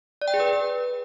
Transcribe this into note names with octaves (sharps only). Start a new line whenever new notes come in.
D5
G5
G#4
B4